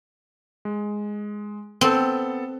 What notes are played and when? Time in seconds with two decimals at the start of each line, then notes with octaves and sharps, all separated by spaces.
0.65 G#3
1.81 B3 C4 A4